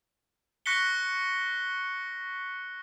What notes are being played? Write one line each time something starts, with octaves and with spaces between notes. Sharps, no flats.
C#6 F#6 A#6 B6 C#7 G7